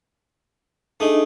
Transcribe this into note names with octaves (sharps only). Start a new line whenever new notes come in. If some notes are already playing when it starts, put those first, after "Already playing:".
A3 D4 D#4 G#4 D#5